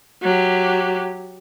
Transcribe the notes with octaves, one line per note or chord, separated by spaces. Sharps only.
F#3 G4